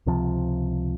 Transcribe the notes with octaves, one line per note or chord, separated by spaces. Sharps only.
C#2 C3 F3